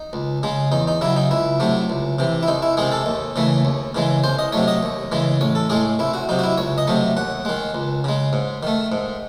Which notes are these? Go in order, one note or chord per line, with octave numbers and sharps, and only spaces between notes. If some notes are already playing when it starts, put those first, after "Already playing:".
Already playing: D#4
C#2
C#3 G#3
E2 D#4
D#4
C#3 F#3 E4
D#4
C#2 E4
C3 F#3 A3
C#2
C3 E3
E4
C2 D#4
E4
C3 D#3 G#3 G#4
A4
D#2
C#3 E3 A3
D#2
C#3 E3 G#3
C2 C5
D#5
C3 F#3 A3 C#5
D#5
D#2
C#3 E3 G#3
A1 C#5
A4
A2 G#3 G#4
C2 E4
F#4
C3 F#3 D#4
F#4
E4
C#2 C#5
D#5
C3 F#3 A3
D#2 F#5
D#3 G#3
C#2
C#3 G#3
G#2
D#3 A3
G#2